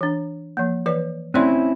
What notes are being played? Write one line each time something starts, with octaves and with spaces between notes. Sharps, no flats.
E3 D4
F3 A#3
E3 B4 D5
A3 C4 C#4 E4 D5 C6